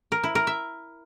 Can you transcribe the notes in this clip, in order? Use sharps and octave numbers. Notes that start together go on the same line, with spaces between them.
A#4
E4
A#4
E5